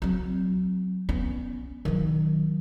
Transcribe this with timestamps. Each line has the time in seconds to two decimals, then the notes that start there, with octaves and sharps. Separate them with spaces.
0.02 F#3 C4
1.09 B3 C#4
1.85 D#3 F#3